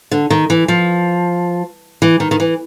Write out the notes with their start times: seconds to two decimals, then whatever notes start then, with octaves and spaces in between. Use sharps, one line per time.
0.11 D3
0.30 D#3
0.50 E3
0.68 F3
2.02 E3
2.20 D#3
2.31 D#3
2.40 E3